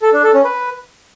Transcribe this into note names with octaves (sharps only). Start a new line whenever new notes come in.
A4
D4
A4
C#4
B4